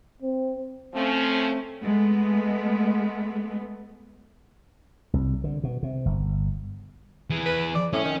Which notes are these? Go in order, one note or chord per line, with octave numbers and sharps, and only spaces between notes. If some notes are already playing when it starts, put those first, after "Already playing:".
C4
F3 A3 C4 C#4
G#3 A3 B3
C2
D3
B2
C3
G1
E3 G#4
B4
D5
A2 C#4
D#3